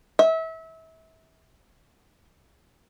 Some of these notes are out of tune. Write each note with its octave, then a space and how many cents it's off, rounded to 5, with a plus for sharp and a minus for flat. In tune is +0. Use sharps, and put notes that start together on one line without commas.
E5 -30